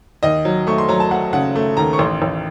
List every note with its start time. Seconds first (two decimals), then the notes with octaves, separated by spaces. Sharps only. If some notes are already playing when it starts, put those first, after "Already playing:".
0.23 D#2 D#5
0.45 F#3
0.67 A3 C#6
0.78 C6
0.89 F#3 A#5
1.00 A5
1.11 A3 F#5
1.33 C#3 F#5
1.55 A3
1.77 D#2 A#5
1.93 C#6
1.99 A1 C6
2.22 A1